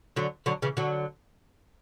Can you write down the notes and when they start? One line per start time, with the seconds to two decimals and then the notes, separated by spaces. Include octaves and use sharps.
0.16 D3 F#3
0.46 D3 F#3
0.62 C#3 E3
0.77 D3 F#3